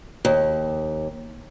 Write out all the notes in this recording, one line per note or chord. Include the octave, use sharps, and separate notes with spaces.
D#2